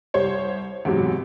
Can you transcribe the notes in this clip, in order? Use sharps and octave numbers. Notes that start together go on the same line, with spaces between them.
C2 G3 C5 C#5
E2 G#2 C3 F#3